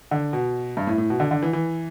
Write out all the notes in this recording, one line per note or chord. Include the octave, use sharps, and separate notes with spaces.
D3
B2
G2
A2
A2
B2
D3
D3
E3
E3